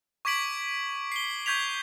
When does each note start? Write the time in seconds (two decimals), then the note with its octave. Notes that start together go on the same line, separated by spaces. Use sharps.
0.25 C#6 D6 G#6 B6 D7 F#7
1.12 C7 G7
1.46 C#6 G6 G#6 B6 F7